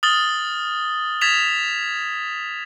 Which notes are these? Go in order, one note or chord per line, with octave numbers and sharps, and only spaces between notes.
D#6 F6 A6 F#7 G7
D#6 G#6 A6 B6 E7 F7